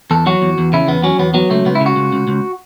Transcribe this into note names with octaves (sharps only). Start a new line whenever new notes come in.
E2 A4
F#3 F#4
E2
E2
C#3 E4
E2 B3
F#3 C#4
E2 B3
F#3 B3
C#2 A3
C#2 B3
E4
C#3
F#4
C#2
C#2
C#2